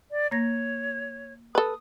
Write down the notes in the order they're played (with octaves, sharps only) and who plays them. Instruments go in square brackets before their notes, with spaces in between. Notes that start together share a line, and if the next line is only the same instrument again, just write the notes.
[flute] D5
[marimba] A#3 A#6 [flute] C#5
[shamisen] A4 B4 [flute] D#6